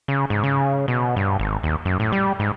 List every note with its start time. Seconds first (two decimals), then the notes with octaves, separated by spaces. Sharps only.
0.08 C#3
0.30 G#2
0.44 C#3
0.88 B2
1.17 G2
1.40 G#1
1.63 D#2
1.85 F#2
2.00 A2
2.12 G3
2.40 G#2